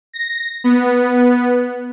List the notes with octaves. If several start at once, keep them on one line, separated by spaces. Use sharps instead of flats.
A#6
B3